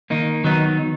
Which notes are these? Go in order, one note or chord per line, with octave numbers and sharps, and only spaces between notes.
D#3 A#3 D#4
D#3 F#3 B3 D#4